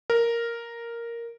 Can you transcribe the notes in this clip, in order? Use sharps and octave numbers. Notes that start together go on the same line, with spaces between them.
A#4